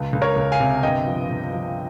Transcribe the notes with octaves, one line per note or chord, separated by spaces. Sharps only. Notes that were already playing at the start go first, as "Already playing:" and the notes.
Already playing: C#2
C#2
A#4 C#5
C#2
F5 G#5
C3
G1 D#5 G5
F3
G1
F3